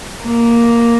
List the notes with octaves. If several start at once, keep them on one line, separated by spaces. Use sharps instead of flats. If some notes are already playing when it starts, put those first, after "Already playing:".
A#3